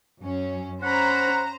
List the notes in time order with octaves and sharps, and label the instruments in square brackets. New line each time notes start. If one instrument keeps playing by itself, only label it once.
[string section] F#2 C#4
[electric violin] C#4 B5 [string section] C5 A#5 [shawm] F#5